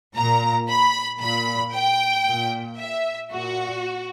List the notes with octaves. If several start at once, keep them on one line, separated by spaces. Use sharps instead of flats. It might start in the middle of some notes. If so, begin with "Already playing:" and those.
A#2 A#5
B5
A#2 B5
G5
A#2
E5
A#2 F#4